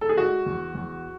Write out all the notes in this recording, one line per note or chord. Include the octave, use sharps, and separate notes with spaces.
A4
G#4
G#3 F#4
E2
E2